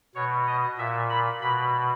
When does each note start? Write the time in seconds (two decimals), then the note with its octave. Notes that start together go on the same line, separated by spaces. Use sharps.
0.15 B2 C#5
0.47 D#5
0.78 A#2 E5
1.10 B5
1.41 B2 B5